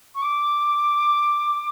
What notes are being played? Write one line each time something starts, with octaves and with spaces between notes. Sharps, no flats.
C#6
D6